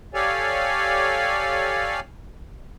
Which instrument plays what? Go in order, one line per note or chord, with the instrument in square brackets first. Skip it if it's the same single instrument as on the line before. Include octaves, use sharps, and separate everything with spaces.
[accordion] G4 A4 C#5 D5 F5 G#5